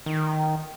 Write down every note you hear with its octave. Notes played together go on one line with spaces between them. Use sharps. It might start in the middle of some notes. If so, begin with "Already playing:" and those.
D#3